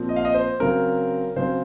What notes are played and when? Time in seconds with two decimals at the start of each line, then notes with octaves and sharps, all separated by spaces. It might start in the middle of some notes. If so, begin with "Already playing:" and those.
Already playing: A#2 F3 C4
0.09 D#5
0.16 F5
0.25 D#5
0.34 C5
0.60 C#3 F#3 C4 A#4
1.36 C#3 F#3 C4 C5